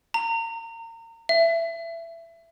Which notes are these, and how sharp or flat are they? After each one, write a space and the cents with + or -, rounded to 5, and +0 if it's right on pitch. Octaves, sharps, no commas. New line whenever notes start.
A#5 -35
E5 +20